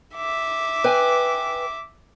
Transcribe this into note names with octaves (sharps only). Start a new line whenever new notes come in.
E5 D6
B4 G5 G#5